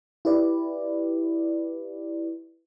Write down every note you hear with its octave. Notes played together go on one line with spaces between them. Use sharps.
E4 G4 B4 D5